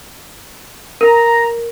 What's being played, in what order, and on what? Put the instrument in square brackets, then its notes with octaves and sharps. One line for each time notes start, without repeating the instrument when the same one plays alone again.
[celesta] A#4 [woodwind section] A#5